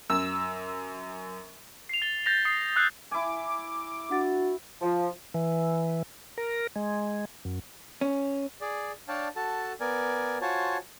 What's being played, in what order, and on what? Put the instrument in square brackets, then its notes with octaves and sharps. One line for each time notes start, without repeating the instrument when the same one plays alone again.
[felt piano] F#2 [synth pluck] E6
[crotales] C7 F7
A6 G7
G6 A6 A#6 F7
D#6 C7 G7
E6 F#6 G6 C7
[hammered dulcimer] E4 G#5 [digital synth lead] D6
[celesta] D4 F#5 A6 [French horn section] F#4
[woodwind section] F3
[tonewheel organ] E3
A#4
G#3
F#2
[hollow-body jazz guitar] C#4
[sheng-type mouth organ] G#4 D5
D4 C#5 D5 F5 G5 A5
F#4 A4 A5
B3 A#4 D5 G#5
F4 F#4 C5 C#5 G#5 A5